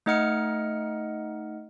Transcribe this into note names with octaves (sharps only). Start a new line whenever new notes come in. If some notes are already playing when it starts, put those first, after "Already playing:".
A3 D#4 D#5 F#5 F6 C#7